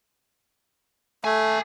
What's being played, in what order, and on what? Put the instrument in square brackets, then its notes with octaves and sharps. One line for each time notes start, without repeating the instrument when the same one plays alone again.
[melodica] A3 [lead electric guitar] A4 G#5